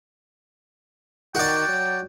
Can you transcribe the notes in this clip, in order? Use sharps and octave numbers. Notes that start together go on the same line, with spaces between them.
D#3 F#4 D5 G5
F#3